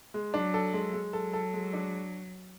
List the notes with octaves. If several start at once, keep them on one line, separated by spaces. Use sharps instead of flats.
G#3
F#3 D4
A4
G#3
G#3
F#3 A4
A4
G#3
D4